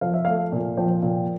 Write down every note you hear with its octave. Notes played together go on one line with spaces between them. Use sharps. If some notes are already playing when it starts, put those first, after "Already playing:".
F3 F5
E5
A3 F5
A#2
F3 G5
A#2